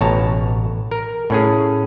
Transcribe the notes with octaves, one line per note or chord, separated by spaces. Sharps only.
A1 B2 C#5 A5 A#5
A#4
A2 C#4 G#4